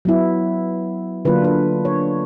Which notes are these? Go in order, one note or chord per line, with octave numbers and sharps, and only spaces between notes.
F#3 B3 E4
D3 F#3 A#3 D4 F4 B4
B4
C#5